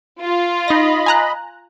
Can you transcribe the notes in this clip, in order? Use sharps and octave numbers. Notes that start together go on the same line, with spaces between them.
F4
D#4 D#5 B5 A#6
G#5 A#5 F#6